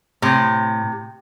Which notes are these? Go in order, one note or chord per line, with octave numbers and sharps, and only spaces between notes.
A2 C3